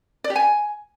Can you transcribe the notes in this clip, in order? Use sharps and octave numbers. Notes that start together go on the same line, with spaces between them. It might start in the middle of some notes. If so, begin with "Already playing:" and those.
D5
G4
G#5